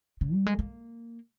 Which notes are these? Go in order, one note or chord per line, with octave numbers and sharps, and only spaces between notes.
C#3
G3
G#3
A#3